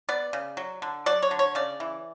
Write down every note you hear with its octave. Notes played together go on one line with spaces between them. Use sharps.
B3 D5
C#3
F#3
D3
F#3 D5
C#5
D3
C#5
C#3 D5
E3